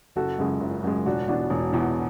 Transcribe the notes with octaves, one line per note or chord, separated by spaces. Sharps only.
F#1 F#4 A4
F#2 C#3 G#3
F#1
F#2 C#3 G#3
E1 D4 F#4
E2 B2 D4 F#4
E1
E2 B2